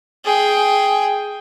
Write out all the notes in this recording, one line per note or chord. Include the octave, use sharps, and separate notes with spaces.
G#4 G5